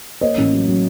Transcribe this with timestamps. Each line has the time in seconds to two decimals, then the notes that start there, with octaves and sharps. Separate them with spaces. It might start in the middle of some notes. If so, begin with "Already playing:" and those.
0.21 A#3 C#5 D#5
0.37 A1
0.53 F#3
0.68 F#3